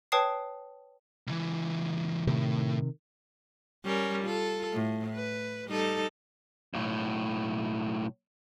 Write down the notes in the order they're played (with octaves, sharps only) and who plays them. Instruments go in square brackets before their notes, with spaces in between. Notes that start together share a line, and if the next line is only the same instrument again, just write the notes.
[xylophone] B4 C#5 G5 A5 D#6 C7
[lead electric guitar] C#2 E3
[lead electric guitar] A2 [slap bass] C3 D#3
[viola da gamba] G3 C#4 A#4
F4 A4
A2
B4
G3 D#4 A4
[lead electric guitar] B1 A2